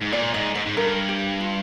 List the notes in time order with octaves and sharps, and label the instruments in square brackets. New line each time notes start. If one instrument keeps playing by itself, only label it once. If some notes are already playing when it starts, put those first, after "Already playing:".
[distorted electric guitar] G#2
[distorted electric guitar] A#2 [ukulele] D5
[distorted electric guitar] G#2 [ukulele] D#5
[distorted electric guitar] G#2 [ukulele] C5
[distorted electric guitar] G#2
[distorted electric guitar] G2 [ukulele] A#4
[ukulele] G4
F4